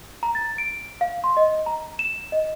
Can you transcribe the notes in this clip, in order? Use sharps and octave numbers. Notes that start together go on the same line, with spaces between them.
A#5
A6
D7
F5
C6
D#5
A#5
E7
D#5